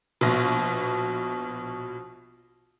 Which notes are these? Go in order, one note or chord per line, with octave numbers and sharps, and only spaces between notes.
A#1 B2